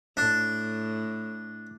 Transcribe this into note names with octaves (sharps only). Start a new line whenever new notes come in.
A2 D4